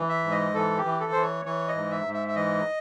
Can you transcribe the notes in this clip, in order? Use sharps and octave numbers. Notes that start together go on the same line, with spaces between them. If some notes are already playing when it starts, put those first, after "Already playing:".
Already playing: E3
E5
G#2
D#5
E3 A4
G4
E3
A4
E3 C5
C#5
E3 C#5
D#5
G#2
E5
G#2
E5
E5
E3 D#5